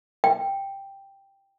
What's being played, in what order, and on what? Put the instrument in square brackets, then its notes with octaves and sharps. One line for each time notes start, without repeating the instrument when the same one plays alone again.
[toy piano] G5